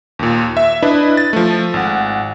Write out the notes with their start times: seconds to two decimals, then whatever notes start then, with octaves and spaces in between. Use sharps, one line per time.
0.19 D#2 A#2
0.57 E5
0.82 D4 E4 B4 D#5
1.17 A6
1.33 F3 A3
1.74 G#1 F#5